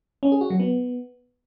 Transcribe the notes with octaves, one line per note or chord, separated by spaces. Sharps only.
C#4
G#4
F#4
F#3
B3